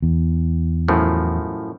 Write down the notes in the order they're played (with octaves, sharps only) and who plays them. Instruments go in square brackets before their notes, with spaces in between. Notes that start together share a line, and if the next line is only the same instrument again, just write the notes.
[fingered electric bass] E2
[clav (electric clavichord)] F#2 A2 F3